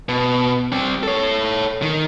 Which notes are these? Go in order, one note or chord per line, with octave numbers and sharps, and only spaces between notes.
B2
G3 C4
A4 C#5
D#3